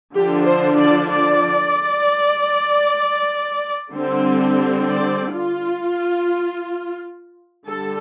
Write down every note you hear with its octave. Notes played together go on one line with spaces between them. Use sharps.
D3 F3 D4 G4
C5
D5
D5
D3 G3 C4
D5
F4
D3 G3 A4